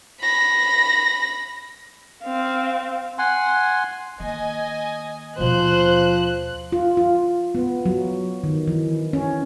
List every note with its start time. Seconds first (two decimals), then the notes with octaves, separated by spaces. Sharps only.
0.20 B5 A#6
2.24 C4 F5
3.18 F#5 G#5 C6
4.20 D#3 A#3 D#5 G#5
5.39 D#2 B2 F3 C5 F#6
6.72 F4
6.97 F4
7.55 B3
7.86 F#3
8.44 D#3
8.68 E3
9.13 C#4